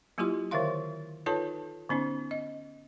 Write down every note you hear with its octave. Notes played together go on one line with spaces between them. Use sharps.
F#3 A#3 E4 F4 G4 C6
D3 D#3 A#4 E5 F5 C6
D#4 F4 A4 B4 C#5 A5
D3 B3 C#4 D#4
D#5